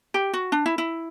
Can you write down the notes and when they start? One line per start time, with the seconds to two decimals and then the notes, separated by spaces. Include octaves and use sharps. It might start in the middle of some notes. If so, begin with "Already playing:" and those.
0.14 G4
0.33 F#4
0.52 D4
0.66 E4
0.78 E4